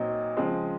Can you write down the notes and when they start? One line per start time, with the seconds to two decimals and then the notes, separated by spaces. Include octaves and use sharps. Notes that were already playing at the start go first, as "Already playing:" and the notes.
Already playing: A#2 F#3 C4 D#4
0.37 C#3 F3 G#3 C4